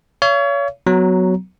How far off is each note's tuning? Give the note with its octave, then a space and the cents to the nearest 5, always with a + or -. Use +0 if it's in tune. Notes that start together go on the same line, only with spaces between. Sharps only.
C#5 +30 F5 -40
F#3 +0 B3 +20 A#5 +5